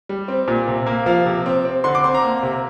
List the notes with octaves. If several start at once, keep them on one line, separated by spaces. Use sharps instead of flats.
G3
C4
A#2
C3
A#3
F3 F5
C3
C4
C4
D3 C6
D6
C4 C6
A#5
A#3
C3